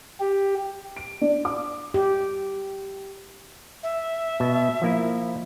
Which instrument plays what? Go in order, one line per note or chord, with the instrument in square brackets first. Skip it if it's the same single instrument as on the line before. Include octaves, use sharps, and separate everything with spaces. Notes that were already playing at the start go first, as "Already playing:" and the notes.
[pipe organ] G4
[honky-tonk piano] D7
D4
D6
[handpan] G4
[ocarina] E5
[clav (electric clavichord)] B2
F3 A#3 E4